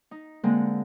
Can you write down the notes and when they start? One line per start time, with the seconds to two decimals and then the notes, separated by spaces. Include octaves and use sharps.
0.11 D#4
0.43 D3 G#3 A#3 C4